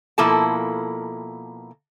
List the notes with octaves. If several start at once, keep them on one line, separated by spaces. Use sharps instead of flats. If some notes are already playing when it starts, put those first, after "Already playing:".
B2 F3 A#3 E4 A4 A5